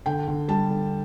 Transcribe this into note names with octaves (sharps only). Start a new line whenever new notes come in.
D3 G5
D3
G3 A5
D3